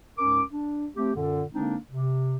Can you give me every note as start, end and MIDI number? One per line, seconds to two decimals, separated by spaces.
0.19 0.41 37
0.19 0.41 44
0.19 0.41 61
0.19 0.41 70
0.19 0.41 86
0.52 0.87 62
0.96 1.10 57
0.96 1.10 60
0.96 1.10 67
1.15 1.43 42
1.15 1.43 46
1.15 1.43 50
1.53 1.76 50
1.53 1.76 56
1.53 1.76 58
1.53 1.76 60
1.53 1.76 62
1.53 1.76 63
1.91 2.36 48